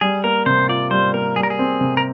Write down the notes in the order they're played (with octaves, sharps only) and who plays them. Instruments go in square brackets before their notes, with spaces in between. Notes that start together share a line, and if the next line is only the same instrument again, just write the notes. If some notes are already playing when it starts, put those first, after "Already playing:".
[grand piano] G3 [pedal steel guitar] G#4
[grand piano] A#3 [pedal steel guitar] A#4
[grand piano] C3 [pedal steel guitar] C5
[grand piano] F4 [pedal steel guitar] D5
[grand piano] G3 [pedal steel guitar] C5
[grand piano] A#3 [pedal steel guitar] A#4
[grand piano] G3 [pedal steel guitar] G#4
[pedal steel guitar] A#4
G#4
[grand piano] C4
C3
[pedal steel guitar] A#4